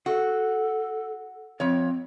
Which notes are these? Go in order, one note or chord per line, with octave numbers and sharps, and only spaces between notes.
F#4 A4
F2 F3 C4 C#5